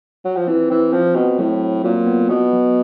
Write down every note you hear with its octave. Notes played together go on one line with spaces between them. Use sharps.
F#3
F3
E3 C4
E3 C4
F3 C4
B2 C4
A2 F#3
F#3
A#2 F#3
B3
B2 B3
F#3